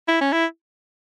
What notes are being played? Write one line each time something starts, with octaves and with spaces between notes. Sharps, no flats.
E4
C#4
E4